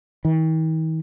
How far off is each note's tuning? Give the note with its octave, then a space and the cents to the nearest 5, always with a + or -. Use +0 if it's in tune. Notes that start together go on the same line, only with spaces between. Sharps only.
D#3 +45